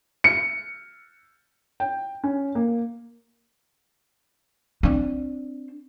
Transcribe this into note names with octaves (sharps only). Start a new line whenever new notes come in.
C#7
G5
C#4
A#3
C4 D4